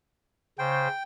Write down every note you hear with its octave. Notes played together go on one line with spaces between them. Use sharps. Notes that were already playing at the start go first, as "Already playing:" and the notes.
C#3 C5 G5